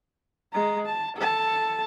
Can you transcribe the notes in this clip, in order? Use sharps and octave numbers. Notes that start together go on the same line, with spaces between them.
G#3 A#5
A5
A4 A5